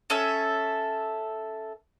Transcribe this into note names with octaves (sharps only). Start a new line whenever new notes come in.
C#4 A4 E5